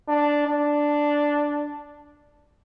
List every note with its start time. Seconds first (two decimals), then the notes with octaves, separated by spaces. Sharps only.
0.08 D4
0.47 D4